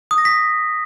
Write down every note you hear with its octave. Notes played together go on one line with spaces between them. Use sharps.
D#6
A#6
B6